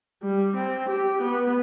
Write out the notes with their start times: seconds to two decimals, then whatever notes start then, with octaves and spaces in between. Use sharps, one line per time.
0.23 G3
0.56 C4
0.89 G4
1.22 B3